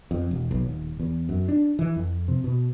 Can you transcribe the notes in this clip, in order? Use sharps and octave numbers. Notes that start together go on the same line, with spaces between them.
F2
E1
B1
D#1
E2
F#2
D4
E3
F2
C3
B2